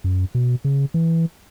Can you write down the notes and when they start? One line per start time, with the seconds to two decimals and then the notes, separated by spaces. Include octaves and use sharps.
0.04 F#2
0.35 B2
0.65 C#3
0.94 E3